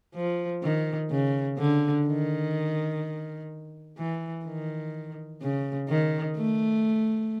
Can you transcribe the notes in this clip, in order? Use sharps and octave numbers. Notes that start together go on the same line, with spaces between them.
F3
D#3
C#3
D3
D#3
E3
D#3
C#3
D#3
A3